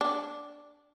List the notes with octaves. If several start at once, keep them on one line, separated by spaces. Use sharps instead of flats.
D4